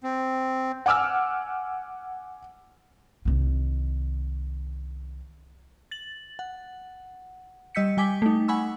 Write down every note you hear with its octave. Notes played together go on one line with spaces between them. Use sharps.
C4
F#5 G#5 D6 E6 F6
C2 D#3
A6 F#7
F#5
G3 D#5 E6 G6 B6 C#7
G3 G5 G#5 D6 B6 G7
A3 D#4
F#5 G#5 B5 C#6 E6